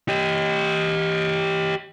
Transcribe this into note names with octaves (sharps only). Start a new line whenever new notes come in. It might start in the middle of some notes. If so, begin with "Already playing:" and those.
G4 D#5